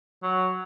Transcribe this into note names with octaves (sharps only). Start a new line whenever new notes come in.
F#3